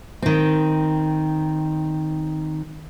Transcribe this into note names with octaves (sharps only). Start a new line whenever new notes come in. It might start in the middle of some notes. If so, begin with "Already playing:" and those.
D#3 C4